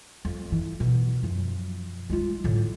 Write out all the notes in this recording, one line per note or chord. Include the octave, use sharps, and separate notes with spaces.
F2
E3
B2
F#2 F3
G#3 F4
A2 D3